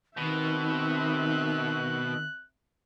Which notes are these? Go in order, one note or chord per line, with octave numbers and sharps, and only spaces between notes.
B2 D#3 C4 E5 F#6